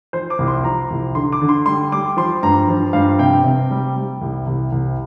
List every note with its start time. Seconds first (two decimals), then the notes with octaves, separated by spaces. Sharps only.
0.13 F3 C5
0.30 D6
0.39 C2
0.48 C6
0.64 F3 A#5
0.90 C2
1.15 D3 C6
1.32 D6
1.41 D3
1.49 C6
1.66 G3 C6
1.92 G3 D6
2.17 F3 C6
2.43 G2 A#5
2.68 F3
2.93 G2 F5
3.19 C3 G5
3.44 C3
3.71 G3
3.96 G3
4.21 C2
4.47 C2
4.72 C2